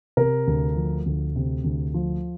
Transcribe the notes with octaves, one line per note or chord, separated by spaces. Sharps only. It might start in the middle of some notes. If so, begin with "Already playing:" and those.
C3 A#4
D2
F3
D2
C3
D2
F3